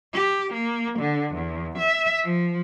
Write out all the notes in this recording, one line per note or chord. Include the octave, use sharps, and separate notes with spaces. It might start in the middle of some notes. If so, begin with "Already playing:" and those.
G4
A#3
D3
E2
E5
F3